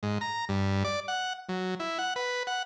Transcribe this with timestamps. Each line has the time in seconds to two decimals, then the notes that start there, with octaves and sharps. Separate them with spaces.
0.03 G#2
0.21 A#5
0.49 G2
0.85 D5
1.08 F#5
1.49 F#3
1.80 E4
1.99 F#5
2.16 B4
2.47 F#5